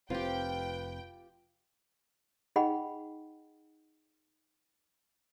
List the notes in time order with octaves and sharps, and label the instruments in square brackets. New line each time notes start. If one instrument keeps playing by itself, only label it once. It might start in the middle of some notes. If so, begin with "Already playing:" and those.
[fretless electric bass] F1 C4 [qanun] F4 G4 [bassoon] B4 [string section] G5
[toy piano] D#4 G#4 D#5 F#5 G5 B5